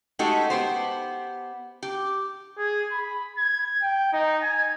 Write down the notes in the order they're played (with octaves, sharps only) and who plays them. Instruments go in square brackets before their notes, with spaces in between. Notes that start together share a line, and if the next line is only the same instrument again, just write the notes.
[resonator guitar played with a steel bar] G#3 A3 D#4 F#4 G4 A4
B3 G4 C5
G4
[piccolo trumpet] G#4
B5
G#6
G5
D#4
G#5